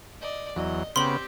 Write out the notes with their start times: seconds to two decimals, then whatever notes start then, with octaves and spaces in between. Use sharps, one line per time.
0.20 D5 D#5
0.56 E2 F#3 D#5
0.96 C#3 B3 C4 G4 C6 F#7